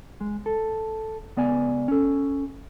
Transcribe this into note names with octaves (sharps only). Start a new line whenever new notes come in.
G#3
A4
C#2 B3 D5 G#5
C#4 A4